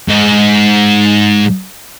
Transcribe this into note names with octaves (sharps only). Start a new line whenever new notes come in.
G#2 D#5